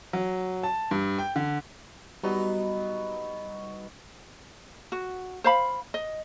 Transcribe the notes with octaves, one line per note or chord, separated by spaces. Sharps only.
F#3
A5
G2
G5
D3
F#3 G3 B3 D#4
F#4
C5 F5 B5
D#5